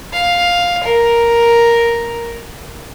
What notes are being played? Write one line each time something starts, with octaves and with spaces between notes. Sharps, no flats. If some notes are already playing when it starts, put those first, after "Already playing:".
F5
A#4